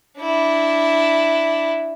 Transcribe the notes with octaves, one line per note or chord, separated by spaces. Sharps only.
D4 E4